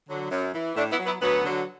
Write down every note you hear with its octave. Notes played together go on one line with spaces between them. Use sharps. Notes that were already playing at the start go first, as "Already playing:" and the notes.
D3 F#3
F#2
E3
A2 A3 D4
B3 E4
F#3
B3 E4
D2 F#3 B3
D3 F#3